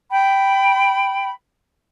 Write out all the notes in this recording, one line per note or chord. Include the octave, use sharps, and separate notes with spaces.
G5 B5